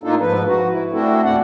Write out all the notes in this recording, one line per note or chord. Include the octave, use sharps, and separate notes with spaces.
A2 A#3 D4 D#4 F4 A4
G#2 F3 B4
F#4
E4
A3 C4 D4 E4 F#4 A4
E2 A#2 D4 D5 F#5